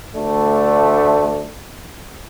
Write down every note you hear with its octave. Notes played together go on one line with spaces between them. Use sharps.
D2 A3 D4